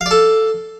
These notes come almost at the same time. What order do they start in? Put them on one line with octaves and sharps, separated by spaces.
F5 D5 A4